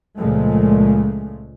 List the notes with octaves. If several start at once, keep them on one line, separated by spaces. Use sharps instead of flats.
C#2 A#2 F3 G#3 A3